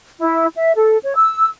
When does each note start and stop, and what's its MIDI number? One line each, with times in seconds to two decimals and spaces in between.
0.20 0.47 64
0.56 0.72 76
0.75 0.97 69
1.04 1.13 73
1.16 1.47 88